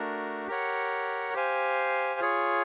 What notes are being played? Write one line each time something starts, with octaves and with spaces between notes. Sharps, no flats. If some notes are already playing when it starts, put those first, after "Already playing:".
Already playing: A3 D4 F#4 A#4
G4 A#4 C#5 F#5
G4 C5 F5 G#5
F4 G#4 C#5